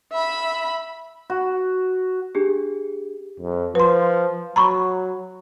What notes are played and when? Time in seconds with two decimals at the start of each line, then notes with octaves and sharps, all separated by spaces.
0.12 E5 B5
1.30 F#4
2.35 D4 G4 G#4
3.40 F2
3.75 F3 B4 C6
4.56 F#3 A#5 B5 C#6